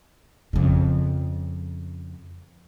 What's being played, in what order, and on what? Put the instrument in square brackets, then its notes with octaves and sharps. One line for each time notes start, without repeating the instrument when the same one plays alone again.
[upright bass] F2 C#3